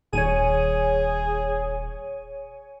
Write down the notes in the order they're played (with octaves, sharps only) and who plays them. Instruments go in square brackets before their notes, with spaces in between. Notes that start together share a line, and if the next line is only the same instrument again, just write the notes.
[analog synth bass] D#1 [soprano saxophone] G#4 [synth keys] C#5 G#5 D#7